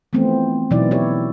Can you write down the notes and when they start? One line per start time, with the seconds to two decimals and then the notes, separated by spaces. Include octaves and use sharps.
0.13 E3 F3 A3 B3 C4
0.71 B2 E3 F#3 D#4 E4 D5
0.91 E4 G4 C#5